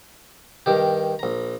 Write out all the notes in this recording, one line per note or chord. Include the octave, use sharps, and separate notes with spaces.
G2 D#3 G4
A#1 A#5